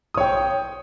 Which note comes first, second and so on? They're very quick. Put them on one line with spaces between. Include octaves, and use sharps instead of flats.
D#6 C#5 G5